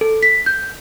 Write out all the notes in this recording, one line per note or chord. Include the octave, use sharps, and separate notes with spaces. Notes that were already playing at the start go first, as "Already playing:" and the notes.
A4
B6
G6